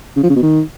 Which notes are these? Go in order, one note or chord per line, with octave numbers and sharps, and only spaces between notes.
C#3
F3
C#3
B2
D#3